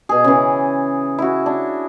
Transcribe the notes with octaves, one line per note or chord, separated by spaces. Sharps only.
B2 G#4
C#3 E3
E4 F#4
D4